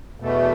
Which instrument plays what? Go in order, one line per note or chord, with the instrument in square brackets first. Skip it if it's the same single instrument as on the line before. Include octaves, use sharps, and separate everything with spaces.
[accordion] E2 B2 A3